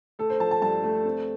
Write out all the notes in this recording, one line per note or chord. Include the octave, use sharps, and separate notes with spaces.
A3 A4
C5
F3 A5
A5
G2 A5
A3
C4